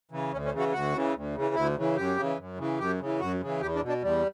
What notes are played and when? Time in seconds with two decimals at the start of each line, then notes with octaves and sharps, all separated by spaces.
0.11 C#3 E3
0.32 D2 C#4
0.45 C#4
0.53 C#3 E3
0.59 F#4
0.72 D2 F#4
0.93 C#3 E3
1.15 D2
1.35 C#3 E3
1.55 D2 E4
1.76 C#3 E3
1.96 F#2 G4
2.17 C#3 E3
2.38 F#2
2.58 C#3 E3
2.79 F#2 G4
3.00 C#3 E3
3.20 F#2 F#4
3.40 C#3 E3
3.61 E2 G4
3.76 D4
3.82 B2
3.88 D4
4.02 E2 G3